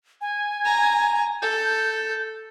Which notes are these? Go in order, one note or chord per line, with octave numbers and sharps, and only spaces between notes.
G#5
A#5
A4 G6